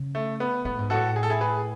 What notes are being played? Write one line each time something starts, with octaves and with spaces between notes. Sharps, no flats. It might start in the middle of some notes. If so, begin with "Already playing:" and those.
Already playing: C#3
A3
B3
A2 B3
G#2
A2 F#4 A4
G#4
A4
E4 G#4
G#4 B4